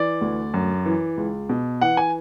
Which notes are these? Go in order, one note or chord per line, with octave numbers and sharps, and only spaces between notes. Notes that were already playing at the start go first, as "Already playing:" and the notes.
Already playing: E3 D5
D2
F#2
E3
C#2
B2
E3 F#5
G#5